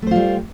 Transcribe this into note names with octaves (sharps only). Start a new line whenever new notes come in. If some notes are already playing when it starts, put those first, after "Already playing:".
G3 A3 F4 C5